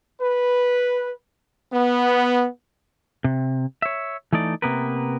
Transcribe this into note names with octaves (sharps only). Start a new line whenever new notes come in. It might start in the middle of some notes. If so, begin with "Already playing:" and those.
B4
B3
C3
C#5 E5
E3 A3 D#4 D5
C3 A#3 B3 A#4 B4